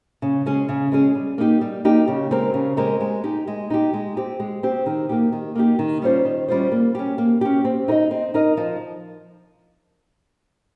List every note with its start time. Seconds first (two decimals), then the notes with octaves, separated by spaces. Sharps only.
0.22 C#3
0.46 G#3 C#4 G#4
0.69 C#3
0.92 G#3 C#4 G#4
1.15 G3
1.38 A#3 D#4 G4
1.61 G3
1.85 A#3 D#4 G4
2.08 C#3
2.31 G#3 C4 G4 A#4
2.54 C#3
2.77 G#3 C4 G4 A#4
3.01 G#3
3.24 D#4 G4
3.48 G#3
3.70 D#4 G4
3.93 G#3
4.17 C4 G4
4.40 G#3
4.63 C4 G4
4.86 D#3
5.09 A#3 D#4 G4
5.32 D#3
5.55 A#3 D#4 G4
5.79 D#3
6.02 G3 C#4 F4 C5
6.25 D#3
6.49 G3 C#4 F4 C5
6.72 A#3
6.95 C#4 G4
7.18 A#3
7.41 C#4 G4
7.65 C4
7.88 D#4 A#4 D#5
8.11 C4
8.34 D#4 A#4 D#5
8.57 F3